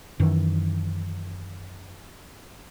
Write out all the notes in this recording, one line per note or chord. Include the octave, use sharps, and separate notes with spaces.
F#2 D#3 E3